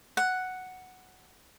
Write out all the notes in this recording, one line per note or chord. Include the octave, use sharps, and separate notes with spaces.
F#5